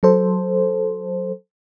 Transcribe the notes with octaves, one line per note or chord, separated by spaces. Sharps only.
F#3 A4 C5